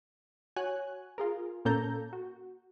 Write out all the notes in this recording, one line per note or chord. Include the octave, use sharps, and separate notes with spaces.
F#4 C#5 G#5 F#6
F4 G#4 A#4
A#2 A#3 C#4 A4 A#5 G6
F#4